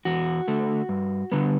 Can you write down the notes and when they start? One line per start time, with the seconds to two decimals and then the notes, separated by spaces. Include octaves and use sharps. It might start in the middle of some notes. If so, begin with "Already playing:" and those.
0.05 E2 F#4
0.48 D3 A3
0.89 G2
1.32 D3 G3 B3